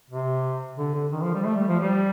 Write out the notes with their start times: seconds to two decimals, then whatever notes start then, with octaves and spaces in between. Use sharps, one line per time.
0.11 C3
0.78 D3
0.95 D3
1.12 D#3
1.22 F3
1.34 G3
1.45 A3
1.56 G3
1.68 F3
1.79 G3